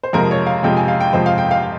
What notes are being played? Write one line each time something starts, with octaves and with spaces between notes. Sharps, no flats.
C5
F2 C3 F3 G#3 A#4
C#5
F5
F2 C3 F3 G#3 G5
G#5
F5
G5
F2 C3 F3 G#3 C5
F5
G5
F5
F5